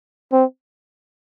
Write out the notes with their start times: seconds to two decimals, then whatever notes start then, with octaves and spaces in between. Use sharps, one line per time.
0.32 C4